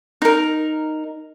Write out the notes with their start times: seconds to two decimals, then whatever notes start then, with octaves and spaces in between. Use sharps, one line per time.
0.22 D#4 A#4